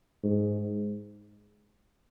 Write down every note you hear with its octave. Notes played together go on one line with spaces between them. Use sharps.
G#2